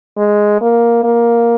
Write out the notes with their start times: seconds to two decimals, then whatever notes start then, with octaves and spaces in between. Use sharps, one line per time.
0.18 G#3
0.61 A#3
1.04 A#3